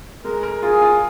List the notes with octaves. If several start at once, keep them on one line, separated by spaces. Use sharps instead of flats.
G#3 A#4
A#4
F4 G#4
F4